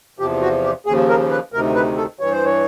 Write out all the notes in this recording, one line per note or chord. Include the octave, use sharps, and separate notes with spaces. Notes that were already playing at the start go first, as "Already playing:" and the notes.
E2 C3 F3 G4
F#4
G4
D#2 C#3 F3 G#4
A#4
B4
D2 C3 D#3 A#4
B4
A4
G2 E3 C#5
C5
C#5